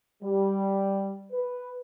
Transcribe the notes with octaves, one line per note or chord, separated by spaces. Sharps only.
G3
B4